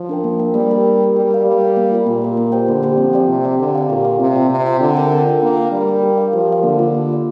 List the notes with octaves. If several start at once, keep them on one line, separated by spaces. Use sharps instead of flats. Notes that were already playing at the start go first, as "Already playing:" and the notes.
Already playing: F3
D4 A#4 G5
A#3
D4 A#4 G5
G3 A#3
G4 A#4
A#3
G4 A#4
G3 G4
A#4 F5
G3 G4
A#4 F5
A#3
F4 A#4
A#2 A#3
F4 A#4
A#3
G4 C5 G5
D3 A#3
G4 C5 G5
F3 C4
G4 D5 G5
C3 C4
G4 D5 G5
D3 G4
D5 F5
A#2 G4
D5 F5
C3 C4
F4 D5 G5
C3 C4
F4 D5 G5
D3 F4
A#4 G5
F4
A#4 G5
A#3 D4
A#4 G5
G3 D4
A#4 G5
G4
A#4 F5
F3 G4
A#4 F5
D3 A#3
F4 D5
A#3
F4 D5